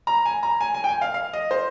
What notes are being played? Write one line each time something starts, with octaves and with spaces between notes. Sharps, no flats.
A#5
G#5
A#5
G#5
G#5
G5
G#5
F5
F5
D#5
C5